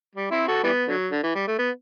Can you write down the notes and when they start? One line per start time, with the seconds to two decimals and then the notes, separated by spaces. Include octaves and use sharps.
0.15 G3
0.31 C4 E4
0.48 F#4 A4
0.64 E3 G3 B3
0.88 D3 F#3
1.11 D3
1.24 E3
1.35 G3
1.48 A3
1.59 B3